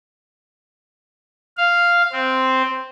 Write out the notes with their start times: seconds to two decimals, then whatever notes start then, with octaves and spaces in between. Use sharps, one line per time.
1.58 F5
2.12 C4